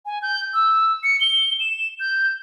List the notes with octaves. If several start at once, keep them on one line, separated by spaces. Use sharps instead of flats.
G#5
G6
E6
C#7
G7
E7
G6